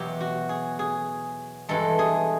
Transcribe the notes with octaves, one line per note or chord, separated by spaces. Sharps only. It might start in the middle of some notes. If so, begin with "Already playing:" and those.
Already playing: E2 B2 F#3 G4
F#4
G#4
G#4
G2 E3 G#3 A4
G#4